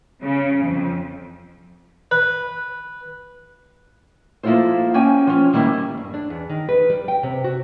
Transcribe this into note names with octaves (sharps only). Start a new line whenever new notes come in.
C#3
F2
B4
F3 A#3 E4 F4 A4 C5
A#3 C#4 G5 G#5
F3 C#4
D#3 G3 A#3 E4
G2
D4
E2
D#3
B4
G3
G5
C3
F#4